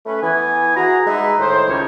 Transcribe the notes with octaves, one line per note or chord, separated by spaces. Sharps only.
A3 C#4 B4
E3 B3 G#5
F#4 G#4 A#5
G#3 D#4 G#4 B4 E5
A2 D#3 C5
C#2 G3 D4 D#4 C#5